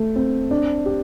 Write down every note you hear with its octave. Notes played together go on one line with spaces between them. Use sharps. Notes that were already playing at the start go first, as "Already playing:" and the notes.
Already playing: A3
C4
D4
G4